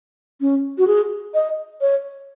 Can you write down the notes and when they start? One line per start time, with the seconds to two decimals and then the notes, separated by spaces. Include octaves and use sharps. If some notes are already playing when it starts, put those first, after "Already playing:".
0.41 C#4
0.78 F#4
0.87 G#4
1.34 D#5
1.81 C#5